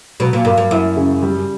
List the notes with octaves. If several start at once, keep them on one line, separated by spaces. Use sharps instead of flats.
B2 F#3
A#2
G2 A#3
G2
F#2 E4
C#3
G3